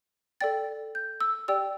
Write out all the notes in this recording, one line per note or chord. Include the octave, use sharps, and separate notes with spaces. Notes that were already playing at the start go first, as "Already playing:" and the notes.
A4 D5 G5 A6
G6
E6
G4 D5 G5 E6